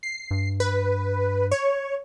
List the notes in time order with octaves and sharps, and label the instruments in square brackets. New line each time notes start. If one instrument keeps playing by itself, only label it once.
[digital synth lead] C7
[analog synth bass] G2
[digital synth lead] B4
C#5